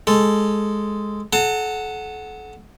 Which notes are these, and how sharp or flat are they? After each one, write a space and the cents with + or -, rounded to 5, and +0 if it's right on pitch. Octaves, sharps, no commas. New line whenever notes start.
G#3 +0 A4 -5
A4 -40 F#5 +0 A5 +40